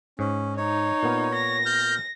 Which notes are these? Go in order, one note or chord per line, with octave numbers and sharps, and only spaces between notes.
G#2 C#4
D#4 C#5
A#2 B3 A#4
A#6
F6 G6